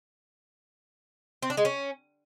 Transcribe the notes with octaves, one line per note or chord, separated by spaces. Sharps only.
C4
D4
G#3
C#4